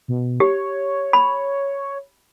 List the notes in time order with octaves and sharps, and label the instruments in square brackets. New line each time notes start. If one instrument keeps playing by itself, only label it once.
[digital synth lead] B2
[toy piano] G4 [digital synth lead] C#5
[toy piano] B5